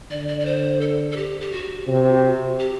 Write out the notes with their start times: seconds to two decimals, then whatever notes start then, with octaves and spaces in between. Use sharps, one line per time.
0.10 D3 D5
0.28 D5
0.40 D5
0.45 C5
0.81 A4
1.11 A4
1.17 G4
1.41 G4
1.52 F#4
1.87 C3
2.59 G4